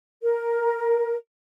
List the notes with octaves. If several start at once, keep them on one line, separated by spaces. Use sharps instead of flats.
A#4